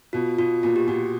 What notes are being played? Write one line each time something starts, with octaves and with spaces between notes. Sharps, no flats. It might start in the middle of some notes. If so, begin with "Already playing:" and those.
B2 F4
B2 F4
A#2 F4
G4
A#2 F#4